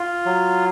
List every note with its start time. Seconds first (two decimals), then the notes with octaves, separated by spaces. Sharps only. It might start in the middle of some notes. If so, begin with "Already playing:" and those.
Already playing: F4
0.26 F#3